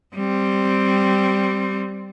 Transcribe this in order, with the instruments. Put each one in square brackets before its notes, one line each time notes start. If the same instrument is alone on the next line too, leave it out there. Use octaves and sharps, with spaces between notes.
[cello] G3 C4